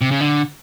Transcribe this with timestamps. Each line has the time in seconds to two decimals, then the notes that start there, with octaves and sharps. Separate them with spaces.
0.01 C3
0.11 C#3
0.21 D3